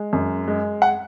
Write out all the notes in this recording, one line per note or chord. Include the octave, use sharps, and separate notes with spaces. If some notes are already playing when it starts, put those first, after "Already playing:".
Already playing: G#3
F#2
G#3
F#5